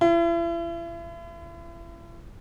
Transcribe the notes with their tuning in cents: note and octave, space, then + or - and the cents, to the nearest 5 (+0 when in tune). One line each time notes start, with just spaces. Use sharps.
E4 +40